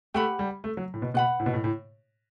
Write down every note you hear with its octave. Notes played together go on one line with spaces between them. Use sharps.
A3 G4 B4 F#5 B5
G3
A3
F#3
A2
B2
B2 B4 F#5 B5
A2
B2
A2
A2